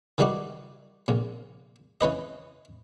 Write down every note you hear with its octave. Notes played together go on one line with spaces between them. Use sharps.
D#3 E3 G3 D#4 F#4 D5
A#1 A#2
E3 C#4 B4 D#5